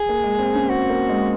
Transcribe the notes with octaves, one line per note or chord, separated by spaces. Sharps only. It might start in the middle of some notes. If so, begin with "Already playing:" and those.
Already playing: G#4
A#3
G#3
C4
C#4
C4 F#4
A#3
G#3